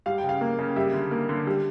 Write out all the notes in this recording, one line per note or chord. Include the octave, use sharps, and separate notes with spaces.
G3 F5
G5
C#3
F5
A#3
C#3
G3 E5
D3
A#3
D3
G3